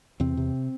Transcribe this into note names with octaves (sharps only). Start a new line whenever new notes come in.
E2 C3 C4
C3